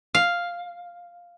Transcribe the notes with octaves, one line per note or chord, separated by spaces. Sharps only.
F5